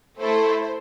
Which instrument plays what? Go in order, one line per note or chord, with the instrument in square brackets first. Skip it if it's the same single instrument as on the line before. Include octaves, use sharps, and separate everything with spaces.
[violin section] A3 E4 A4 C5